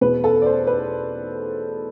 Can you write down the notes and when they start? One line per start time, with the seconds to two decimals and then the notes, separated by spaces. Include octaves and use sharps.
0.01 E2 B2 B3 B4
0.24 A4
0.42 D5
0.46 C5
0.67 B4